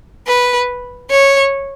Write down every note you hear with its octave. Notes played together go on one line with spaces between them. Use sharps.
B4
C#5